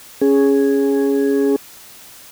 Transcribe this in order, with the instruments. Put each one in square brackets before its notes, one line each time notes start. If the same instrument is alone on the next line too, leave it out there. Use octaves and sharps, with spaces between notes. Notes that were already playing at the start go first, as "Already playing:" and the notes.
[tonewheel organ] C#4 G#4